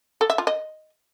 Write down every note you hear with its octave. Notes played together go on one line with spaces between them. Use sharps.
A4
E5
F4
D#5